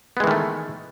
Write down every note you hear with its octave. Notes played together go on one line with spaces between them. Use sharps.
D#3 E3 G#3 A3 B3